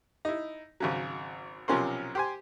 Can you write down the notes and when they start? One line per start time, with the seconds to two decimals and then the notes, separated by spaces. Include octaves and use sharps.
0.25 D#4 E4
0.80 G#1 C#3 F#3
1.68 B1 C3 F3 C#4 A#4 C5
2.15 G4 C5 G#5